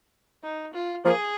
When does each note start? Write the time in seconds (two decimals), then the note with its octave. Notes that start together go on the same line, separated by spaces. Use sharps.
0.43 D#4
0.73 F4
1.05 F3 A#3 G#4